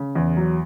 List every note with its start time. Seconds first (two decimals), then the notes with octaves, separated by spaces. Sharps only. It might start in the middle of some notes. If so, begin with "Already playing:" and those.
Already playing: C#3
0.15 E2
0.37 F#3